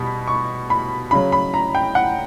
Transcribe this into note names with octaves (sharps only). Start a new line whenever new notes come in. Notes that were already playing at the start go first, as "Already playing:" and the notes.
Already playing: B2 G3 B5
C#6
B5
C#3 F#3 B5
B5
A#5
G5
F#5